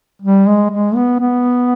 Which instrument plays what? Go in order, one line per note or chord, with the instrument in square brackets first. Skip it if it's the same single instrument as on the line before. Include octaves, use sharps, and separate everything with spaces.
[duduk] G3
G#3
G#3
B3
B3